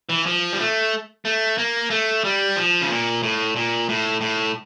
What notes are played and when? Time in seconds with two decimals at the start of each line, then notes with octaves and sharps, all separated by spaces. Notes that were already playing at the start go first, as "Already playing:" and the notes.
0.09 E3
0.26 F3
0.53 G3
0.60 A3
1.25 A3
1.58 A#3
1.90 A3
2.24 G3
2.56 F3
2.81 C#3
2.90 A#2
3.23 A2
3.56 A#2
3.89 A2
4.21 A2